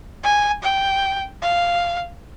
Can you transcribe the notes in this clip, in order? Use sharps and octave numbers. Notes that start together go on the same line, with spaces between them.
G#5
G5
F5